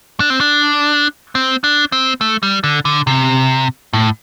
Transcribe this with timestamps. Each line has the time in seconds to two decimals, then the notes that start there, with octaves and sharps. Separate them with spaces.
0.20 D4
0.30 C4
0.41 D4
1.35 C4
1.64 D4
1.92 C4
2.21 A3
2.43 G3
2.64 D3
2.85 D3
3.07 C3
3.93 A2